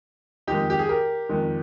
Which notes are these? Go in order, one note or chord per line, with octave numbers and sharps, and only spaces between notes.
F2 D#3 G#3 D#4 G4
G4
G#4
G4 A#4
F2 D#3 G#3